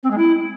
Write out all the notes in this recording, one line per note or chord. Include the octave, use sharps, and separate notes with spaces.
C4
G#3
E4